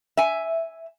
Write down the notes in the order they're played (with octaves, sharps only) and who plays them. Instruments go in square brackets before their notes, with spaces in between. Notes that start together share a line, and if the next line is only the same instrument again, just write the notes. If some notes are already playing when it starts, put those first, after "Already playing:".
[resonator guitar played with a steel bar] E5 G#5